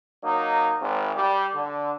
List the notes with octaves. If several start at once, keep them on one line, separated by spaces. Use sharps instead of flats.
F#3 A#3 D#4
G#1
G3 G4
D3